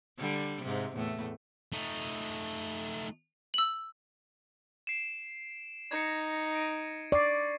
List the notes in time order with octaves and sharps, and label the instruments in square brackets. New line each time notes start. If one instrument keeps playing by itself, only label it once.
[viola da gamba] D3 G3
G#2 C3
E2 A2 A3
[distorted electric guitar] A3 D#4
[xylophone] E6 F#7
[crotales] C7 D7 E7
[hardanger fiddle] D#4 [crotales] G#6 A#6 C#7
[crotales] D7 D#7
[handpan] D5 [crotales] C#6 C7